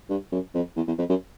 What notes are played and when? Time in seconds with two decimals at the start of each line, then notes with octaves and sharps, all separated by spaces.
0.10 G2
0.32 F#2
0.54 F2
0.76 E2
0.87 E2
0.98 F2
1.10 F#2